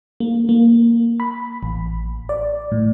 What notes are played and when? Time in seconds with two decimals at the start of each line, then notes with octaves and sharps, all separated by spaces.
0.20 A#3
0.49 A#3
1.20 B5
1.63 A1
2.29 D5
2.72 A2